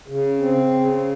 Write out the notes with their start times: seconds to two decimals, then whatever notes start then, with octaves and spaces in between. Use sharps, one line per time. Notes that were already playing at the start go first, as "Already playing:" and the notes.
0.08 C#3
0.41 C4
0.74 C#3